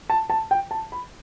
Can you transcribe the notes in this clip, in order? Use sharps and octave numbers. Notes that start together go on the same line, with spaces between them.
A5
A5
G5
A5
B5